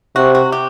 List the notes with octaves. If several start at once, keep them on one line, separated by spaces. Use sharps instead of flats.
C3 F#4
F#4
G4